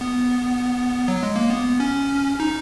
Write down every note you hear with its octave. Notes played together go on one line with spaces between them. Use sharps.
B3
F#3
G#3
A#3
B3
C#4
D#4